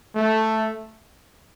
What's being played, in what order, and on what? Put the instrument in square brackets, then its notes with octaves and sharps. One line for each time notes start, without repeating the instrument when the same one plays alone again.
[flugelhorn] A3